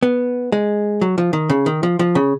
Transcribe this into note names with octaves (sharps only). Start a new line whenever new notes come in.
B3
G#3
F#3
F3
D#3
C#3
D#3
F3
F3
C#3